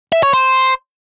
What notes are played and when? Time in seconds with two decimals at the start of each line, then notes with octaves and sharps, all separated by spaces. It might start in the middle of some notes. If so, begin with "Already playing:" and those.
0.12 E5
0.23 C#5
0.34 C5